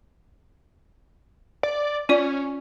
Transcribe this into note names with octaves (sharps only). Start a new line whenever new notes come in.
D5
C#4 F4 D5